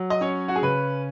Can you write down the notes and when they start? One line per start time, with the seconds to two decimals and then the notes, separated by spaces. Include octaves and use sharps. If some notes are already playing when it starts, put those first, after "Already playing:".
Already playing: F#3
0.10 D#5
0.21 C#4 C#5
0.48 F#4
0.56 G#4
0.62 C#3 B4